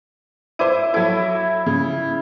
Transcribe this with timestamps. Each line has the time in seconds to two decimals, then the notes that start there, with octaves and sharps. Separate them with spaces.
0.59 E4 C5 D6 D#7
0.94 F#3 E4 A4
1.66 C#3